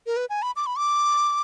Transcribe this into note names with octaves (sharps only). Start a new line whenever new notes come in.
A#4
B4
G#5
B5
D6
B5
D6